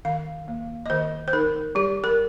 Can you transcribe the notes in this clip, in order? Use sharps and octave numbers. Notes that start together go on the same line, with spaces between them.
D#3 F5
A#3
D#5
D#3 C5
C5
D#4 A#4
G3 G4
A#4